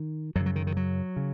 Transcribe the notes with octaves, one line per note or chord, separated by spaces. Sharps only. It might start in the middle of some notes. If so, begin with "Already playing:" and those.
Already playing: D#3
F#2 C#3 F#3
F#3
D#3
D#3
F#3
C#3